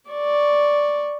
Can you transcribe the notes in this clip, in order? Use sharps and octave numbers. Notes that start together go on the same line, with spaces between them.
D5 C#6